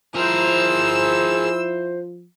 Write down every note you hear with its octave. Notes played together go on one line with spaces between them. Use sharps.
F3 E4 G#4 A#4 C5 E6